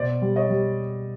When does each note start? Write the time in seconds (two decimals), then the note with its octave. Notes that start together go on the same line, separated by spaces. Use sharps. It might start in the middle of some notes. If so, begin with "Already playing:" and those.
Already playing: B2 C5 D5
0.22 G3
0.36 C#5 D#5
0.50 G3